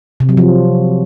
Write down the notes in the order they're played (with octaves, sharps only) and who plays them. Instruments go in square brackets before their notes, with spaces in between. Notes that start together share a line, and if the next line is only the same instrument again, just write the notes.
[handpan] C3
F#3
F3